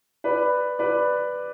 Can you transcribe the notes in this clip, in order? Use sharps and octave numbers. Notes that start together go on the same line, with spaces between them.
B4 D5
B4 D5